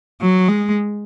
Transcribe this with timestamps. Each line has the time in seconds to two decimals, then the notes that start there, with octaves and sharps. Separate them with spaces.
0.21 F#3
0.48 G#3